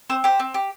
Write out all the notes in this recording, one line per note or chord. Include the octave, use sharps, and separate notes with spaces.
C4 C5
G4 C5
C4
G4